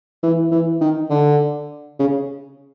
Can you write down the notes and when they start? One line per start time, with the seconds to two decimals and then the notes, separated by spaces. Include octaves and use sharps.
0.23 E3
0.52 E3
0.81 D#3
1.10 D3
1.99 C#3